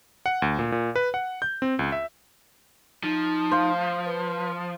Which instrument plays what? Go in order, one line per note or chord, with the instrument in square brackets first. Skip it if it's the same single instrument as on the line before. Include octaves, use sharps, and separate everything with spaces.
[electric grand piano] F#5
D2
A#2
A#2
B4
F#5
G6
C4
C#2
E5
[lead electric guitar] F3 [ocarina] D#4
[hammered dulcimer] C5 F5
[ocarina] B4